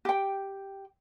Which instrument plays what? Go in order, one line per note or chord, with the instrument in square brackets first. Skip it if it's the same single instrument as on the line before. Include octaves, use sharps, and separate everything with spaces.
[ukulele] G4 G5